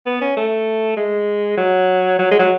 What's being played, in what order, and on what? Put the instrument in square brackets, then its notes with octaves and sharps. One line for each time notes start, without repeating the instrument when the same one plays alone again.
[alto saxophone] B3
C#4
A3
G#3
F#3
F#3
G#3
F#3